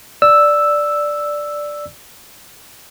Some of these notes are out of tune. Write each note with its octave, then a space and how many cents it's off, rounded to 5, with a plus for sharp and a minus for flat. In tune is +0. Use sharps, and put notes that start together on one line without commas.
D5 +0 E6 +0